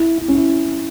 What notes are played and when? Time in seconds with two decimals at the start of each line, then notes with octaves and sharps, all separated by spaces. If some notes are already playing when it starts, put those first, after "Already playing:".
Already playing: E4
0.18 E4
0.28 C#4
0.35 E4